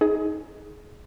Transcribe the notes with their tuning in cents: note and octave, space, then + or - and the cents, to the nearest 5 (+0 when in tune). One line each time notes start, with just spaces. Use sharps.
D#4 +25 G#4 +15